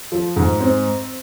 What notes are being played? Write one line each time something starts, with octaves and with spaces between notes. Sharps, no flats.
F3
G#2
C4